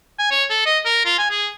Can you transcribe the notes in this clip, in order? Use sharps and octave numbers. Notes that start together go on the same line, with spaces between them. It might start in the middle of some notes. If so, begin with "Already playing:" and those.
G#5
C#5
A4
D#5
A#4
F4
G#5
G#4